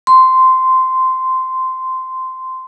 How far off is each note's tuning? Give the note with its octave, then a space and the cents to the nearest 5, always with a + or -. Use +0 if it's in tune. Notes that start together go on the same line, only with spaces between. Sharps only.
C6 -10